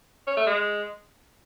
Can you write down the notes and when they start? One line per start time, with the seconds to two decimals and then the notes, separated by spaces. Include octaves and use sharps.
0.27 C#4
0.37 A3
0.47 G#3